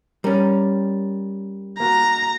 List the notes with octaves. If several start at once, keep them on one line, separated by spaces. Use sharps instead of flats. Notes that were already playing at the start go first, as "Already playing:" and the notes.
G3 C#4 A#4 A#5 A6
A#3 F#4 A#5